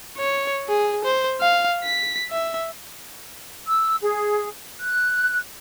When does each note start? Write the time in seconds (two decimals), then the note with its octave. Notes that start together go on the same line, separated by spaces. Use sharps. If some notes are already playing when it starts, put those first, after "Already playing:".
0.17 C#5
0.68 G#4
1.05 C5
1.41 F5
1.84 B6
2.31 E5
3.67 E6
4.01 G#4
4.80 F#6